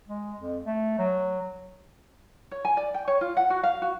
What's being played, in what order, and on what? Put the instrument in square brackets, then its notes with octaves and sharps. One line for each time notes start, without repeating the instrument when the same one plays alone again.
[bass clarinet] G#3
F2
A3
F#3
[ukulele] C#5
G#5
D5
G5
C#5
F4
F#5
F#4
F5
F#4